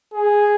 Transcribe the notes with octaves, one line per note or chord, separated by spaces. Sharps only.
G#4